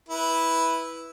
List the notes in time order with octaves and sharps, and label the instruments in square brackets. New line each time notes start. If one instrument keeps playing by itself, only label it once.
[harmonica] E4 B4